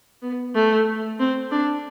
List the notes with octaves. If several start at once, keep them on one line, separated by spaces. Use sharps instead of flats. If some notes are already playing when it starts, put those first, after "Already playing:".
B3
A3
C4
D4